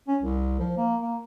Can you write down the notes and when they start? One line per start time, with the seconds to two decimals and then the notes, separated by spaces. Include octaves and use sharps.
0.08 C#4
0.22 C2
0.60 F3
0.77 A#3
1.02 A#3